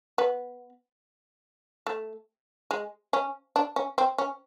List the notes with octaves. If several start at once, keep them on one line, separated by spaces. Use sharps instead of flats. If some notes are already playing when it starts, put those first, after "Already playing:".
B3
A3
G#3
C#4
D4
C#4
C4
C#4